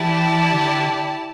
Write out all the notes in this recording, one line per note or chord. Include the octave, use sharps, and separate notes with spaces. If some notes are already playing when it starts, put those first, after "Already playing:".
Already playing: E3 E4 G4 D5 A5
D3